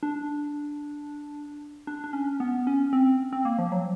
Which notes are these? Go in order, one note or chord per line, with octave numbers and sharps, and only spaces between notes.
D4
D4
D4
C#4
B3
C#4
C4
C4
A#3
F3
F#3